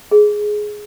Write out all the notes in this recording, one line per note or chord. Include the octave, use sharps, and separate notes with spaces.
G#4